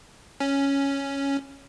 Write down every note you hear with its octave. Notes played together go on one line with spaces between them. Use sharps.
C#4